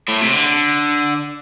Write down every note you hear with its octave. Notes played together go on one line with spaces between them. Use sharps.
A2
C3
D3